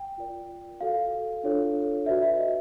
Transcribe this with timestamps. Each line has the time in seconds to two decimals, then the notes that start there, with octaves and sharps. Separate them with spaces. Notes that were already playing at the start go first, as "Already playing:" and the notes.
Already playing: G5
0.18 F4 A#4 D5
0.81 F#4 A4 D5 F5
1.44 D4 F4 A4 C#5
2.06 F#4 B4 D5 E5
2.22 E5
2.38 D#5